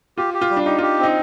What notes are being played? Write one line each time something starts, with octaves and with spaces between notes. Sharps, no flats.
F4 G4
G4
F4
G3
D4
D#4 G4
F4 G4
C4 D#4